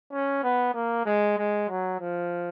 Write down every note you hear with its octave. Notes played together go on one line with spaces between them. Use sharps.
C#4
B3
A#3
G#3
G#3
F#3
F3